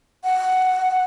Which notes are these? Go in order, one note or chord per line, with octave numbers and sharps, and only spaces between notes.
F#5